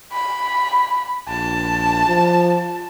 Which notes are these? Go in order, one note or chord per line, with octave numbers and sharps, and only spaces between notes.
B5
A#1 A5
F3